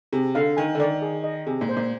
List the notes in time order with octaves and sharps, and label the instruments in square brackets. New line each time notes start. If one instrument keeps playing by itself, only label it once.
[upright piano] C3 [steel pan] G#4
[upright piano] D3 [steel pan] F5
[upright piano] D#3 [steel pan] G#5
[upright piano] D3
[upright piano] D#3 [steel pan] D5
[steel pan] G#4
D#5
[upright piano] C3 [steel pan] G#4
[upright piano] A#2
[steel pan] C5
[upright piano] A#2